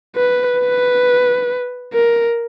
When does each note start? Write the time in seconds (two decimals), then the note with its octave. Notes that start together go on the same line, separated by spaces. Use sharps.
0.16 B4
0.60 B4
1.94 A#4